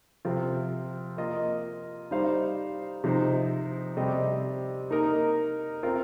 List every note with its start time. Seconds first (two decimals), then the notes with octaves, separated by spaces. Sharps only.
0.25 C3 F3 C4 F4
1.17 A#3 F4 D#5
2.11 G3 D#4 C5 F5
3.04 C3 F3 D#4 C5
3.97 C3 G3 C4 G4 D#5
4.90 A#3 D#4 A#4 D#5
5.83 C4 F4 A#4